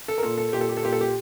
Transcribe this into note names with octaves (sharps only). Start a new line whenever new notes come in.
A4
A#4
A#2 A4
A4
A#2 G4
A4
G4
A4
A#2 G4
A4
G4